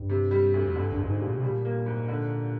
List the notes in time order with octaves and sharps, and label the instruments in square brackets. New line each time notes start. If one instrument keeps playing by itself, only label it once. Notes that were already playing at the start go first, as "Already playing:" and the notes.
Already playing: [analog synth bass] G2
[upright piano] C3
G3
D2
[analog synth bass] F2
[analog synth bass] G2 [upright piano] D3
[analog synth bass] G2
[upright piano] G#3
[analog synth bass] G2
G#2
[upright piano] D#2
[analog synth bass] A#2
C3
[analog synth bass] A#2 [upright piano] G3
[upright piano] A#3
G#2
D3